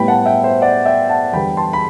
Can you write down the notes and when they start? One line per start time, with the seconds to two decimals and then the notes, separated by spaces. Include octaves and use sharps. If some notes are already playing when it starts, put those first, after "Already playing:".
Already playing: A2 G3 B3 G5 B5
0.08 F#5 A5
0.26 E5 G5
0.43 C5 E5
0.62 D5 F#5
0.85 E5 G5
1.10 F#5 A5
1.33 E2 D3 G3 B3 G5 B5
1.57 A5 C6
1.73 B5